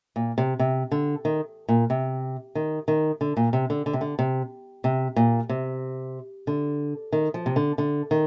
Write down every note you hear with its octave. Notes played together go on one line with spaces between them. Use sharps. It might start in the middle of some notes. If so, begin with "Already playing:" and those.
A#2
C3
C3
D3
D#3
A#2
C3
D#3
D#3
D3
A#2
C3
D3
D3
C3
D3
C3
C3
A#2
C3
D3
D#3
F3
C3
D3
D3
D#3